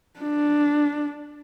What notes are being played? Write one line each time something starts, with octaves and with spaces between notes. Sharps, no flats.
D4